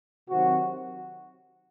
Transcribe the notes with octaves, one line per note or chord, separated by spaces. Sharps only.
C3 D#3 F#3 C4 F#4